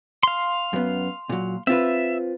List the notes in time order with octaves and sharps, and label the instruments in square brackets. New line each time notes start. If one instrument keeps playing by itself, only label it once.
[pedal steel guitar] F5 C6
[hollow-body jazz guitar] F#2 B3
A#2 F#3
[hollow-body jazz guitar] C4 F4 B4 [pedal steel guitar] E5